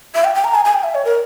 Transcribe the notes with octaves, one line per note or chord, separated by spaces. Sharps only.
E5
G5
G5
A#5
G#5
G#5
G5
E5
C#5
A#4